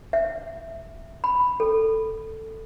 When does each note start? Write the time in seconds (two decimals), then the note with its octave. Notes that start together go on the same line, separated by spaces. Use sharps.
0.13 E5
1.24 B5
1.60 A4